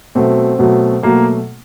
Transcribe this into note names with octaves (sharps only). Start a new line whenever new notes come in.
B2 F#3 A3 C4
B2 F#3 A3
B2 F#3 A3 A#3